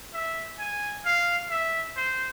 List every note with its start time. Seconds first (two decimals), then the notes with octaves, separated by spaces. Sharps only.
0.14 E5
0.59 G#5
1.05 F5
1.50 E5
1.97 C5